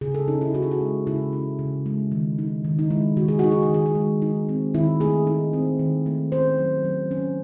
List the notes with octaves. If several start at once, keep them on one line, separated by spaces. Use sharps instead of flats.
C#3 G#4
A4
C#4 D#4
E4
C#3 F#4
G#4
F#4
G#3
C#3 E4
C#4
C#3
G#3
D#3
D#4
D#3
D#4
G#3 E4
D#3 F#4
G#4
D#4 F#4
G#4
F#4
D#3 G#4
F#4
G#3
D#4
C4
D#3 E4
A3 G#4
D#4
C4
D#3
A3
C#4 C5
F#3
F#3
C#4